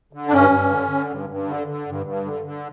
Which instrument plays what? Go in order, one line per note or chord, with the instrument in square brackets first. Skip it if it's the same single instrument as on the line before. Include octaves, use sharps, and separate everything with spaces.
[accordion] D3
D4
G2 C#4
G2
D3
D3
G2
G2
D3
D3
G2
G2
D3
D3